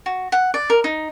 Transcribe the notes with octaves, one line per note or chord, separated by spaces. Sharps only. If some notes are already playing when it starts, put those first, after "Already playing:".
F#4
F#5
D5
A#4
D#4